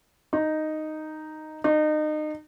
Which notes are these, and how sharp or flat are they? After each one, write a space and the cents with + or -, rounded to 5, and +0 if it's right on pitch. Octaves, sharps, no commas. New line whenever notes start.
D#4 -5
D#4 -30